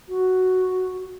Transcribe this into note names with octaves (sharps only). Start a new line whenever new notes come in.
F#4